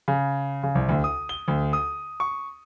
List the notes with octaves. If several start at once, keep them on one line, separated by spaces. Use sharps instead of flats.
C#3
C#3
C2
D2
D#6
G7
D2
D#6
C#6